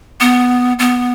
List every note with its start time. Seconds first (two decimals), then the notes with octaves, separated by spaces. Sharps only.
0.21 B3
0.79 B3